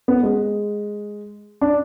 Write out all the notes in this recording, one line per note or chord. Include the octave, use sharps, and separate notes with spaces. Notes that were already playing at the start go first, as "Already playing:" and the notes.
B3
G#3
D4